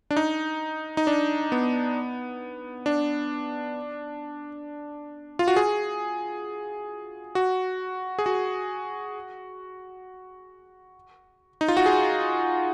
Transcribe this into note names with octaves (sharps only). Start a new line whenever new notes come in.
D4
D#4
D#4
D4
B3
D4
F4
F#4
G#4
F#4
G#4
F#4
D#4
F4
F#4
G#4